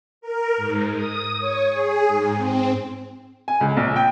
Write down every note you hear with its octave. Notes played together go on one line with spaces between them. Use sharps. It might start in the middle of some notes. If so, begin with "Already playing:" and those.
A#4
G#2
D#6
C#5
G#4
G#2
C4
G#5
C#2
A#1
G5